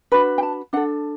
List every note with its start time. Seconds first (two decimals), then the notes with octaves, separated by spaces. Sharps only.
0.12 D4 F#4 B4 B5
0.38 G5
0.43 A5
0.73 D4 A4 F#5